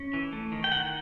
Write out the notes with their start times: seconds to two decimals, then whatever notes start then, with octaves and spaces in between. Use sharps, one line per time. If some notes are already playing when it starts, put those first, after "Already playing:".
Already playing: C#4
0.13 E3
0.33 A3
0.52 D#3
0.64 G5
0.71 D#3 F#5